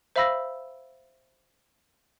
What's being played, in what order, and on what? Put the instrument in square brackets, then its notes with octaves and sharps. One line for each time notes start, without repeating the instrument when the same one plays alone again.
[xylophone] C5 E5 F5 B5 E6 A#6